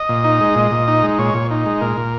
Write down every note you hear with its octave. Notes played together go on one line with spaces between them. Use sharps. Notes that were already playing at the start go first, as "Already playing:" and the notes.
Already playing: D#5
A#2
D#4
G#3
A#2
A#2
D#4
G#3
A#2 C#5
A#2
D#4
G#3
A#2 A#4
A#2